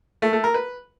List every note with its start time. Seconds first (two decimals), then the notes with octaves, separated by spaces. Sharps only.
0.22 A3
0.33 A3
0.44 A#4
0.54 B4